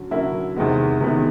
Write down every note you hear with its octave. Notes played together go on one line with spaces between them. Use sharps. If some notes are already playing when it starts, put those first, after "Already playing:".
Already playing: D3 F#3 C#4
D3 F#3 A#3 C#4 E4
E2 C3 D#3 G#3 B3
E2 C3 D#3 G#3 B3